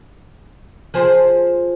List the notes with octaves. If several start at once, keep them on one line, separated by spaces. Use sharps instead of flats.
F3 G#4 C5